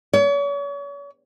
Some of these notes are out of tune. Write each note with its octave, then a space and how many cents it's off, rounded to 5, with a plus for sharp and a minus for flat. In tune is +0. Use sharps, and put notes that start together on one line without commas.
C#5 +40